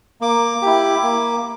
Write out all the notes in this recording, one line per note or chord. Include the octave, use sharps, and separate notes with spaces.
A#3 D6
E4 G4
A#3